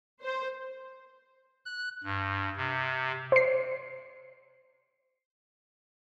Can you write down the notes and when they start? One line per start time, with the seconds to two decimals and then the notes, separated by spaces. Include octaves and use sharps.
0.22 C5
1.66 F#6
2.04 G2
2.57 C3
3.32 C5 C7